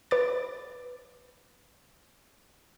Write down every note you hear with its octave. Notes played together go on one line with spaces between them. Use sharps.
B4 D6 A6